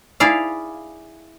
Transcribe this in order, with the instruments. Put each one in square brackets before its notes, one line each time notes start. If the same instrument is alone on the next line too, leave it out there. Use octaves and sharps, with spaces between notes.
[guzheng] E4 G#4 D5 F5